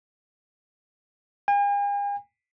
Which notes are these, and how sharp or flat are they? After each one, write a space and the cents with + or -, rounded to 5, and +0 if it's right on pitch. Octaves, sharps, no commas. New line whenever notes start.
G#5 -45